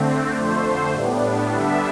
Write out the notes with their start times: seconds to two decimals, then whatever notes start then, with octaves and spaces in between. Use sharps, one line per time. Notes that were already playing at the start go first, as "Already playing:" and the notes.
Already playing: D3 A3 C4
0.34 F2 D3 A3 C5
0.93 A2 G3 B3 D4
1.54 D3 G3 B3 D4 E5